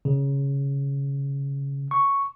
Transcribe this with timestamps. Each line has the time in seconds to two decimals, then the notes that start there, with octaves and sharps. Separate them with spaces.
0.05 C#3
1.91 C#6